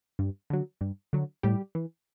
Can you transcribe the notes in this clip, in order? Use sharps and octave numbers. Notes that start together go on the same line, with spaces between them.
G2
D3 F#3
G2
D3 F#3
A2 G3 G4
E3